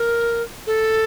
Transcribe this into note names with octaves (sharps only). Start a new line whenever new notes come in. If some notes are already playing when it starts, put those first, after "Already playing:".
Already playing: A#4
A4